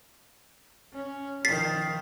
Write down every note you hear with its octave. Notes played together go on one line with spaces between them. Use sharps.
C#4
D#3 F3 A6 B6 C7